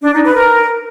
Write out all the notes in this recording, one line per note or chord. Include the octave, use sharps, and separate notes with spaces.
D4
D#4
B4
A#4